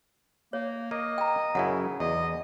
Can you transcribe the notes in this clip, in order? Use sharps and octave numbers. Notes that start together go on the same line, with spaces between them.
A#3 C#5
A#3 D#5
G5 A#5
F#2 C#3 E4 F#5
E2 D#5